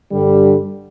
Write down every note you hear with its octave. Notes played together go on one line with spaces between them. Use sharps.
G2 D3 G3